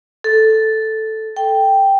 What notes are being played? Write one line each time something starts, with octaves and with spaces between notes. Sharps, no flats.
A4
G5